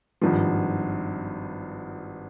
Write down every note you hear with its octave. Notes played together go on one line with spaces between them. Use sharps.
G#1 G2 F3